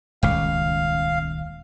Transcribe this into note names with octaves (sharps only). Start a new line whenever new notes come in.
D#1 C#2 F5